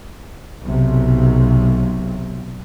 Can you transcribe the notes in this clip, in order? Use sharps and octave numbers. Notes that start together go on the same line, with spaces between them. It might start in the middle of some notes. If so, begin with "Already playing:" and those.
B1 C3